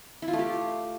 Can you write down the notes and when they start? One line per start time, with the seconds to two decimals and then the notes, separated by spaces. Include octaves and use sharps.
0.22 E4
0.28 F4
0.33 A3
0.39 G4